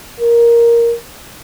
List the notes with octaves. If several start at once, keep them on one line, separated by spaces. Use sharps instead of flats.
A#4